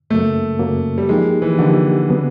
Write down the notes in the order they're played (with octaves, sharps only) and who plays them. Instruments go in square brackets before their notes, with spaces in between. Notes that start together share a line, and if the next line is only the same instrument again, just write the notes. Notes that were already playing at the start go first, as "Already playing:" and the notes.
[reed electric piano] F#2 C#3 F#3 A#3 [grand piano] A3
[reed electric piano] F#2 C#3 F#3 A#3
[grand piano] G3
[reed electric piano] F3 A#3 D#4 G4 [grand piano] G#3
[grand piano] E3
[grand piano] D3 [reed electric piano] F3 A#3 D#4 G4
[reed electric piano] C#3 F#3 B3